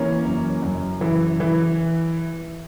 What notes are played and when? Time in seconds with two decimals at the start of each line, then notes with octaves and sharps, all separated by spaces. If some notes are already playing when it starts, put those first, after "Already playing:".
Already playing: E3 A#3 C#4
0.25 F#2
0.63 F#2
1.01 E3
1.40 E3